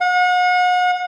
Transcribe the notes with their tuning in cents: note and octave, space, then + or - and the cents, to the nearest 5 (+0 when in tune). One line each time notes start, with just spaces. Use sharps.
F#5 -40